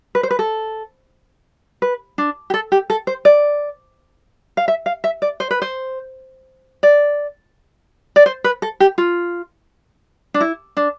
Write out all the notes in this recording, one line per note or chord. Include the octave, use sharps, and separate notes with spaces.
B4
C5
B4
A4
B4
D4
G4
A4
G4
A4
C5
D5
F5
E5
F5
E5
D5
C5
B4
C5
D5
D5
C5
B4
A4
G4
F4
D4
E4
D4